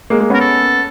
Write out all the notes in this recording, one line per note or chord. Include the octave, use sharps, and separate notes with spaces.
G#3 A#3
G#3 A#3
B3 C#4 A#4
A4